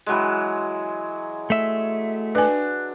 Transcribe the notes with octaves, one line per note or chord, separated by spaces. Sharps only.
E3 F#3 G#3
A3 E5
D4 B4 G#5